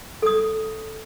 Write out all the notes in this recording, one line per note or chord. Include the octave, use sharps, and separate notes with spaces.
A4 D#6